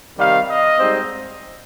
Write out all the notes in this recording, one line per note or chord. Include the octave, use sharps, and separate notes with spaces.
C3 D#3 G3 F5
D#5
G#2 G3 C4 D#4